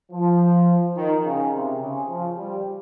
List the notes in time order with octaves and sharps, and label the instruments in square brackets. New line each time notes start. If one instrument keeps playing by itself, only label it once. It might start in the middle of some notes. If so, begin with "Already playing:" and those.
[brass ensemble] F3
D#3
C#3
C3
C#3
F3
G3